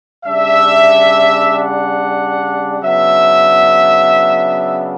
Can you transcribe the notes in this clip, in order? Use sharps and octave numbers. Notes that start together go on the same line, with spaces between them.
C#3 G3 D4 E5
F#5
C#3 F#3 B3 D4 E5